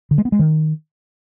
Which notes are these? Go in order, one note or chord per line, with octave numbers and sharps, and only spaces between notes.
D3
G#3
B3
G#3
D#3